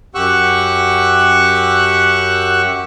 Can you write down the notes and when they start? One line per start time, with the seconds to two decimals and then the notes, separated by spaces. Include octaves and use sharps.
0.15 F#2 G4 F#5 C#6 E6 F#6